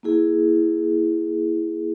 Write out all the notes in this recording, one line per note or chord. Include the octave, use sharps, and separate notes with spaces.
A#3 E4 G#4